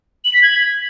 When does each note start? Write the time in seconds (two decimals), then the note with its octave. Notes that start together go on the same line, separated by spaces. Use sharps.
0.25 F#7
0.34 B6
0.43 G#6